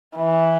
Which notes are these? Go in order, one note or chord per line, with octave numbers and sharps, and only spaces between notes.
E3